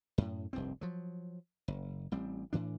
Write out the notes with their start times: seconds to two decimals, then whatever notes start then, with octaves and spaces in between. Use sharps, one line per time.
0.18 F#2 A2
0.53 F1 C2 G2 C4
0.81 F3 F#3
1.68 F#1
2.12 A1 G3 C4
2.53 A2 E3 D4